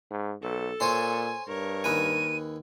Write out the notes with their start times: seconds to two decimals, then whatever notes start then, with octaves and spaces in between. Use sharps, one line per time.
0.11 G#2
0.42 B1 A4
0.80 A#2 C5 C#5 G#5 C6
1.48 G2 A#4 C#5
1.84 D#2 B4 G#5 D#7